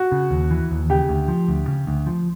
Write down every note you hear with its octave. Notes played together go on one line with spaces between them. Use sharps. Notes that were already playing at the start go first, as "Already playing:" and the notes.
Already playing: F#4
C#3
D#2
E3
D#2
C#3 G4
D2
F3
D2
C#3
D2
F3